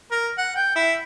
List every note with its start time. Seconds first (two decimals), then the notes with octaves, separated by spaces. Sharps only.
0.11 A#4
0.38 F#5
0.56 G5
0.76 E4